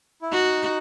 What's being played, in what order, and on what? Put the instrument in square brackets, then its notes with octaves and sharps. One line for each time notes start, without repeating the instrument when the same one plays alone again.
[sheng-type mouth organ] E4
[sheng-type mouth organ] D#4 [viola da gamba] F#4